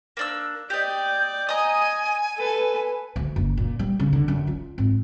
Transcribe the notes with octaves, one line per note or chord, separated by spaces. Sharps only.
A#3 D4 E6
G4 D5 D#5 G6
D#5 G#5 A#5 D#6
A4 B4
D2
F#1
A#2
G3
C#3
D3
F#2
F4
G#1